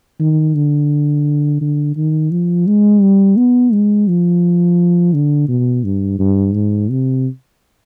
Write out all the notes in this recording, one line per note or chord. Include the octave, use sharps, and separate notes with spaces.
D#3
D3
D3
D#3
F3
G#3
G3
B3
G#3
F3
D3
B2
G2
G2
G#2
C3